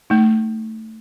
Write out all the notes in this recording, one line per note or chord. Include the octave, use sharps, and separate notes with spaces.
A3 D#4